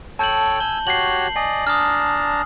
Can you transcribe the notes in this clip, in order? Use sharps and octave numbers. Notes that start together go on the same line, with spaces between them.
A4 C#5 G5 A5 G6 F#7
G#5 E6 G7
F#4 G4 C#5 C7 F#7
D5 D#5 G#5 C7
D4 A5 A#5 D#6 F6